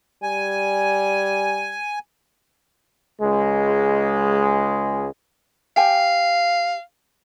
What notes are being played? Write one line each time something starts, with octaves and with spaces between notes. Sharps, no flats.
G3 G#5
C#2 G#3
G4 F5 G5 G#5